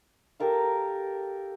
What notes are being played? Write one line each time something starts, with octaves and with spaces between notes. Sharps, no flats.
G4 A4 A#4 F5